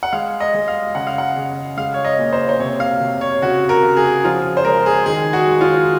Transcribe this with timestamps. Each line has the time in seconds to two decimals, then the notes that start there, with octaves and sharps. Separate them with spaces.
0.03 F#5
0.13 G#3 F5
0.40 D#5
0.54 G#3
0.68 F5
0.95 C#3 F#5
1.07 F5
1.18 F#5
1.36 C#3
1.77 G#3 F5
1.94 C#5
2.05 D#5
2.19 A#2
2.33 C5
2.49 C5
2.60 C3 C#5
2.80 F5
3.01 C3
3.21 C#5
3.42 C#3 F#4
3.69 A#4
3.83 C#3
3.97 G#4
4.24 F3 F4
4.57 C5
4.65 G#3 A#4
4.86 G#4
5.06 D#3 G#4
5.33 F#4
5.47 G#3
5.61 F4